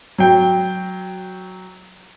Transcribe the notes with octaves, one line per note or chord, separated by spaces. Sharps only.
F#3 G5